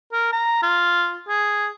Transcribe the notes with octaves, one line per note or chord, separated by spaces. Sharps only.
A#4
A#5
F4
G#4